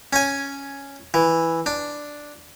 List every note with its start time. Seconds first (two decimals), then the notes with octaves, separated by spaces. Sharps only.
0.13 C#4 G#5
1.14 E3
1.66 D4